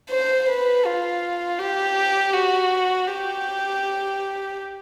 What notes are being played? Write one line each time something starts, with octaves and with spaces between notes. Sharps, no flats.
C5
B4
F4
G4
F#4
G4